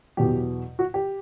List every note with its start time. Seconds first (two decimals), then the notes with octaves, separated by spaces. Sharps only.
0.17 E2 B2 F#3 G4
0.79 F#4
0.94 G4